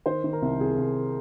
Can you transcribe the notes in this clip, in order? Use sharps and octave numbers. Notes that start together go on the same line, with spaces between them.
D#3 C5
D#3
A#4
C2
C2 G#4
C2